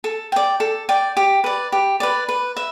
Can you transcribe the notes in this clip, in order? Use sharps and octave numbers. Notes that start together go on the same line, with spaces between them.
A4
D5 G5
A4
D5 G5
G4
B4 D5
G4
B4 D5
B4
E5